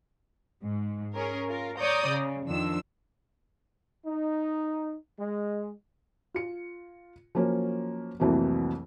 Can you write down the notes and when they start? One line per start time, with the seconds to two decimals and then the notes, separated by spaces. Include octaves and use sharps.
0.64 G#2
1.14 C#4 G#4 A#4 C#5
1.50 F4 A#4
1.79 C#5 D5 A#5 D#6 G6
2.08 C#3
2.47 F2 D#3 F3 D4 E6
4.06 D#4
5.18 G#3
6.34 F4 C#7
7.35 F3 F#3 A#3 C#4
8.20 C2 F2 E3 F#3 A3 A#3